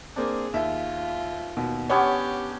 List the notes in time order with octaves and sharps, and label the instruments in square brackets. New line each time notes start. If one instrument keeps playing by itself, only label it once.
[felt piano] A#3 C4 D4 [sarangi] G#4
[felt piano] D#2 E5 [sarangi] F4
[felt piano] D#2 B2
[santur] B3 C#4 D4 [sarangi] G4 [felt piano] C#5